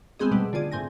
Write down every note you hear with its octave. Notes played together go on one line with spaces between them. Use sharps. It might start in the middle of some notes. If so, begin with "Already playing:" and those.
G#3 A3 B3 C4 G#4 D#5
B2 G3 A3 B4
D3 F4 G#4 D5
A2 C4 G#5 A#6